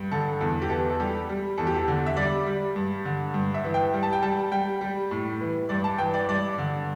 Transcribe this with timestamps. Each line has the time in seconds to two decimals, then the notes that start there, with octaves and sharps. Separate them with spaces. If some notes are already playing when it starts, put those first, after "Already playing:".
Already playing: G2
0.12 D3 A4
0.41 E2 A4
0.62 G4
0.70 E3 A4
0.90 A4
1.00 G3 G4
1.29 G3
1.58 E2 A4
1.67 G4
1.75 A4
1.88 D3
2.06 E5
2.16 G3 D5
2.47 G3
2.76 G2
3.05 D3
3.34 G2
3.54 E5
3.64 E3
3.74 G5
3.94 G3
4.03 A5
4.13 G5
4.22 G3 A5
4.51 G3 G5
4.81 G3
5.11 A2
5.41 E3
5.69 G2 D5
5.84 A5
5.98 E3 G5
6.14 D5
6.28 G2 D5
6.58 D3